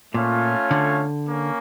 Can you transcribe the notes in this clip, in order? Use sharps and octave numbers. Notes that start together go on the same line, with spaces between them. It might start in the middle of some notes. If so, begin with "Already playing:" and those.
A#2 A3 C#4 F4 C#5 F5
D3
A#3 C#4